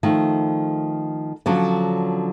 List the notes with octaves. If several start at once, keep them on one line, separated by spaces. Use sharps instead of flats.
D#3 F3 A3
D3 F3 F#3 C#4